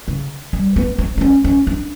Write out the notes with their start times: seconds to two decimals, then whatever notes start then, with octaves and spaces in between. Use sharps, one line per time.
0.08 C#3
0.53 G3
0.76 B3
0.99 C4
1.18 D4
1.21 C#4
1.44 C#4
1.67 D4